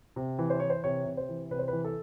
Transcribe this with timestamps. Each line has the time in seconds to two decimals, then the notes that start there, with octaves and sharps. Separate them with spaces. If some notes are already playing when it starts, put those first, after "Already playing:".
0.16 C3
0.39 E3
0.50 C5
0.60 E3 C#5
0.70 C5
0.84 C3 C#5
1.06 C3
1.17 C5
1.29 E3
1.51 C3 B4
1.59 C5
1.68 E3 B4
1.85 A4